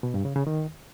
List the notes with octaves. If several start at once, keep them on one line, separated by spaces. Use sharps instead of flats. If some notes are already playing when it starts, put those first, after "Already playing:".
B2
G2
C#3
C#3
D#3